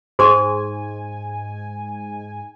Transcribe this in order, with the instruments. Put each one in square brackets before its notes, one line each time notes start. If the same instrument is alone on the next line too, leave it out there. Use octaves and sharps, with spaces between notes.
[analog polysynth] G#2 G#5 [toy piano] G#4 C5 C6